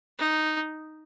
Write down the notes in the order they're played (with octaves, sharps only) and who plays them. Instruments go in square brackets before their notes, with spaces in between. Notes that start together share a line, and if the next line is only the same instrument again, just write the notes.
[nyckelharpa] D#4